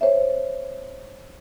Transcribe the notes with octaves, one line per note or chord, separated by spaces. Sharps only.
C5 C#5 E5